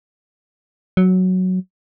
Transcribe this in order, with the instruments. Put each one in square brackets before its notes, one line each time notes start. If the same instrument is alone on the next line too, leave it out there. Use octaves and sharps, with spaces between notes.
[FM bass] F#3